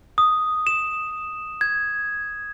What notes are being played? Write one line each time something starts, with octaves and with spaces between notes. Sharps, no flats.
D#6
E7
G#6